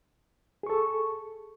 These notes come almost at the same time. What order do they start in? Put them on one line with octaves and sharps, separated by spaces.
G#4 C#6 A4